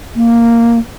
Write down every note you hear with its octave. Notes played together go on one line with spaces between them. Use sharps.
A#3